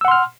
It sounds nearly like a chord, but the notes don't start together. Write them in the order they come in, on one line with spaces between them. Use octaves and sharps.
E6 F#5 C6 F6